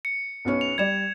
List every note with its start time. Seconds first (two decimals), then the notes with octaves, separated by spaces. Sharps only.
0.05 C#7
0.45 B1 B3 C#4
0.61 F7
0.78 G3 D5 G#6 E7